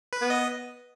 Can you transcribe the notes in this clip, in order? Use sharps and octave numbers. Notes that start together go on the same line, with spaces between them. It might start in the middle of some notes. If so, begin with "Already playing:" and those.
B4
B3
D#5